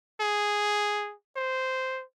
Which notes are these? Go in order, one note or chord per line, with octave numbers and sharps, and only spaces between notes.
G#4
C5